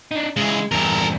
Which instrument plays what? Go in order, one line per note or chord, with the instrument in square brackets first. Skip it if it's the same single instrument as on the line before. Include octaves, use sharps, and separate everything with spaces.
[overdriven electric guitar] D4 D#4
[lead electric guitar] C#3 E3 [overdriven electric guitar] G#3
[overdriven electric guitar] E2 G2 [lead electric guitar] A4 A#4